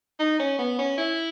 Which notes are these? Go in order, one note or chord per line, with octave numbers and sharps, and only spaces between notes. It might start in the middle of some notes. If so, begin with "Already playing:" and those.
D#4
C#4
B3
C#4
E4